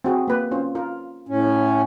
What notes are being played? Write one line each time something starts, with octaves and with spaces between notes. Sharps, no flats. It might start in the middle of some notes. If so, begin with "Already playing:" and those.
C4 F#4 G#4
A#3 B4
C#4 F4 C5
F4 A#4
A2 C#4